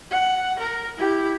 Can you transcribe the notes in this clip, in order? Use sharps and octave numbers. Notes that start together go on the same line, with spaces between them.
F#5
A#4
E4 G4